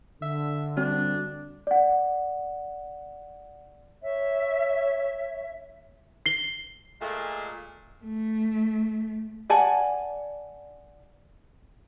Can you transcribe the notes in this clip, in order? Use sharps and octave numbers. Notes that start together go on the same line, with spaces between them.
D3 E5
G3 C4 D4 F#4
D5 F#5
C#5 E5
C7 G7
A#2 G#3 A3
A3
D5 F#5 G#5 A5